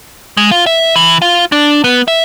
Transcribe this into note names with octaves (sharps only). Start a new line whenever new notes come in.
G#3
F4
E5
E3
F4
D4
B3
E5